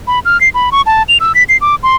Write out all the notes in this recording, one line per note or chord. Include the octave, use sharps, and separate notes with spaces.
B5
F6
C7
B5
C#6
A5
F7
E6
B6
C7
D6
C6